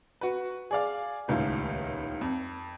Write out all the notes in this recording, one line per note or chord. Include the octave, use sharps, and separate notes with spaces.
F#4 B4
G#4 D5 F5
D#1 C#2 A2 D#3 F4
F2